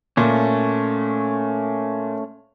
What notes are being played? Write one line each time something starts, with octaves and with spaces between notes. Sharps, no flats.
A#2 A3 C#4